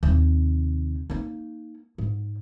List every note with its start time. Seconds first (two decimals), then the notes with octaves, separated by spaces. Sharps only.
0.03 D#2 C3
1.10 A#3 D#4
1.98 G#2